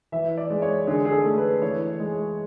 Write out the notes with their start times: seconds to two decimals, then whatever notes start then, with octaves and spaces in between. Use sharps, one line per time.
0.12 E3 E5
0.37 D5
0.50 G#3
0.62 C#5
0.87 D3 G#4
1.05 G#4
1.12 A4
1.24 A3
1.37 B4
1.62 E3 C#5
2.00 G#3